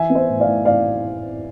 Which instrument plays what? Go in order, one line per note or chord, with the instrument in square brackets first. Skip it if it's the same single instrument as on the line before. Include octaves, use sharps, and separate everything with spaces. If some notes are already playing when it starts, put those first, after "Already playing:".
Already playing: [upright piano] E3 E5 G#5
B3
C5 E5
A2
D5 F5
A2
A2 D5 F5